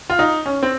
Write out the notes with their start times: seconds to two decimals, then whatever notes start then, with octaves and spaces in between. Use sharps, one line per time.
0.10 F4
0.19 D#4
0.46 C#4
0.63 C4